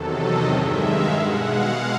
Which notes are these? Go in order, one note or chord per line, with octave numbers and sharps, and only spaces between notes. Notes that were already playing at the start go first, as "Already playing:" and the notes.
Already playing: E2 C3 D#3 F#3 A4
D#5
G2 D#3 G#3 E5
F5
B2 G#3 F#5
F5